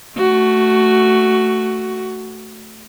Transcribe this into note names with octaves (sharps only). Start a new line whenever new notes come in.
A3 F#4